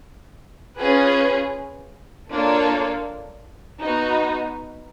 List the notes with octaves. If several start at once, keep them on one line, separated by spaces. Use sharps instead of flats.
C#4 F4 G#4 B4
A#3 D4 F4 A4 C#5
B3 D#4 F#4